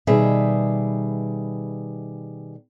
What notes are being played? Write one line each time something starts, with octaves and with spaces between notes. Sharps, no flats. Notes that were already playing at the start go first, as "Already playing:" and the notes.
B2 D#3 G3 G#4 B4 E5